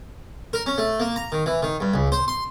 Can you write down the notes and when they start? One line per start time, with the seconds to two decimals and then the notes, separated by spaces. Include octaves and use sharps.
0.53 A#4
0.66 C#4
0.78 A3
1.00 A#3
1.16 A#5
1.32 D#3
1.46 E3
1.62 D#3
1.81 G2
1.94 C#2
2.12 C5
2.28 C6